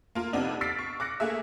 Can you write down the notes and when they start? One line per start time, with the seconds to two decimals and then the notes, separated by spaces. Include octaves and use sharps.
0.15 A#3 F4 A#4
0.33 F2 C3 B3 D4 D#4
0.61 E6 F6 A6 B6 C7 D7
0.79 C#6
1.00 D6 F#6 A#6 C#7
1.20 A3 A#3 G#4 E5